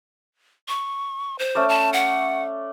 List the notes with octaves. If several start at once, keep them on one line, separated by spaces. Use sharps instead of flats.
C#6
C5
A3 C#4 D5
A5
F#5